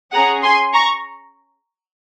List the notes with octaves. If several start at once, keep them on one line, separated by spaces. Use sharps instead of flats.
C#4 G#4 F#5 A#5
G#5 C6
A#5 C#6